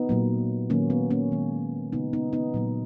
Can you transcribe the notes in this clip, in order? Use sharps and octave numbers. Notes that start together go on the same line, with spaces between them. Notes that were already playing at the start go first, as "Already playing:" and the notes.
Already playing: B3 D#4
A#2 F#3 A#3
D#3 F#3 A#3 C#4
B3
A#3 C#4
D#3 G#3
C#3 G#3 B3 D#4
B3 D#4
B3 D#4
A#2 F#3 A#3